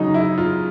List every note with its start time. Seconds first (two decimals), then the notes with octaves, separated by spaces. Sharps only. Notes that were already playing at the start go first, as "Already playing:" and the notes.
Already playing: C#3 F#3 D#4
0.14 E4
0.38 F4